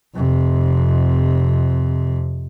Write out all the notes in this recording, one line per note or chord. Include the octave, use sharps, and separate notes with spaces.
F2 C3